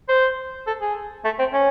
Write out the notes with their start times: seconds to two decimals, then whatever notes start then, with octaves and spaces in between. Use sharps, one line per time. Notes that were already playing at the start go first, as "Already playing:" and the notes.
0.09 C5
0.67 A4
0.81 G#4
1.24 A3
1.39 C4
1.53 C#4